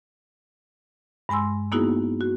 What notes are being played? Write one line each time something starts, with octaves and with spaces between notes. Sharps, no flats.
G2 G#3 G#5 C6 E6
A#3 B3 D#4 E4 F#4 G#4
F#4